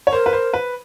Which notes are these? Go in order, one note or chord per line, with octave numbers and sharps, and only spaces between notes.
C#5
A#4 C5
B4
C5
B4